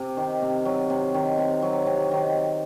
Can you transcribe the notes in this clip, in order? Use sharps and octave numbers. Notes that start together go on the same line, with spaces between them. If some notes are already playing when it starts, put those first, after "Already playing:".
Already playing: C3
D#3
C3
F#3
C3
D#3
C3
F#3
C3
D#3